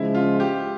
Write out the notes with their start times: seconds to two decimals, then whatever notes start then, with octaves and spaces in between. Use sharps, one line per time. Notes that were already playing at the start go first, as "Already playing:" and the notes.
Already playing: C#3 F3 G#3 E4
0.14 F4
0.40 G4